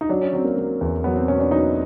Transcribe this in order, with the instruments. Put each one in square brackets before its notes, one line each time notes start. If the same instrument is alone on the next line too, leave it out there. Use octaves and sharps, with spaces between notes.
[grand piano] D#4
F#3 D4
C#4
F#3 C4
A#3
F#3 A#3
E2
F#3 B3
C4
B2 C#4
D4
F#3 D#4